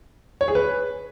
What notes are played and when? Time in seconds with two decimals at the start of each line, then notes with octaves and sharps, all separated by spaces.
0.41 C#5
0.48 G#4
0.55 B4